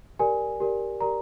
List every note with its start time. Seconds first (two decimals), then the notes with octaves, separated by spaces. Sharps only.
0.19 G4 A#4 D5 G#5
0.60 G4 A#4 D5
1.01 G4 A#4 D5 A#5